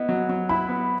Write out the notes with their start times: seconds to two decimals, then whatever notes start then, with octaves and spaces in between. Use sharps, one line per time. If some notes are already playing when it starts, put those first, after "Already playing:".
Already playing: B3 E4 D#5
0.09 F#3
0.29 F#3
0.49 E4 B5
0.69 B3